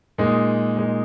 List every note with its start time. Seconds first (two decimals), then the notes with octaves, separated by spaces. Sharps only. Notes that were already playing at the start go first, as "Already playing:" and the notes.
0.18 A#2 G#3 D#4
0.77 A#2 G#3 D#4